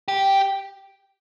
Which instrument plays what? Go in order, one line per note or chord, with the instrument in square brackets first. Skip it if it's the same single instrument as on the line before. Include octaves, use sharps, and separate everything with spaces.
[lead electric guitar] G4